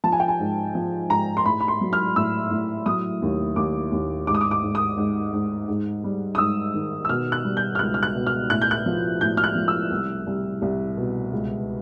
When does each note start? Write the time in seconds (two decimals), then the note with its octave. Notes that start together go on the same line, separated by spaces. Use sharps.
0.04 F3 A5
0.12 G#5
0.20 G5
0.28 G#5
0.39 G#2
0.75 F3
1.10 G#2 A#5
1.37 C6
1.45 A2 B5
1.60 B5
1.68 C6
1.81 F#3
1.93 F6
2.16 A2 E6
2.51 A2
2.86 F#3 D#6
3.22 D#2
3.56 D#2 D6
3.91 D#2
4.27 G#2 D6
4.35 D#6
4.41 D6
4.51 D6
4.62 G#2
4.75 D#6
4.97 G#2
5.33 G#2
5.68 G#2
6.04 G3
6.35 D#6
6.38 G#2 E6
6.74 D#3
7.05 E6
7.09 B2 F6
7.32 F#6
7.44 G3
7.57 G6
7.75 F6
7.79 C#2 F#6
7.94 F6
8.03 F#6
8.15 B2
8.27 F6
8.50 A2 F#6
8.62 G6
8.71 F#6
8.86 F3
9.21 A2 G6
9.37 F6
9.44 F#6
9.55 F3
9.68 E6
9.91 C2
10.27 C2
10.62 C2
10.97 B2
11.32 C#2